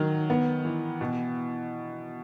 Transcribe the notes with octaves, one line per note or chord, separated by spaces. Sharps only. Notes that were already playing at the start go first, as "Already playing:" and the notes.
Already playing: D#3 F#3
B3
E3
B2